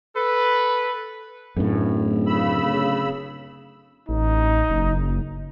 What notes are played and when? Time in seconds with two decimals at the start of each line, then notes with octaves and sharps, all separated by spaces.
0.16 A4 B4
1.56 D1 F#2 A2
2.26 C#3 B5 E6
4.09 A1 D#4
4.70 F#1